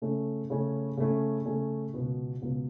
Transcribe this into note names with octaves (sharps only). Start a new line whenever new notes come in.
C#3 A3 C#4
C#3 A3 C#4
C#3 A3 C#4
C#3 A3 C#4
C#2 B2 B3 F#4
C#2 B2 B3 F#4